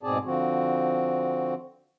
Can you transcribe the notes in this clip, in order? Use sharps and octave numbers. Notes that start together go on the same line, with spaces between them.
G#2 B2 C4 G#4 D5 A5
D3 F3 C4 F#4